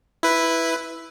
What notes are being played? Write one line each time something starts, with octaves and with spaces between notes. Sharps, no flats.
E4 B4